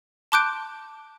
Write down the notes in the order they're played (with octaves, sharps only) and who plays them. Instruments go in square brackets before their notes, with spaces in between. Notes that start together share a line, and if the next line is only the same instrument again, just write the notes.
[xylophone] A5 C6 D6 F#6 G6 D7